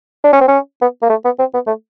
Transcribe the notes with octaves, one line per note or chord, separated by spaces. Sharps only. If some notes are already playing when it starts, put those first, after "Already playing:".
D4
C#4
C4
C#4
B3
A#3
A3
B3
C4
B3
A3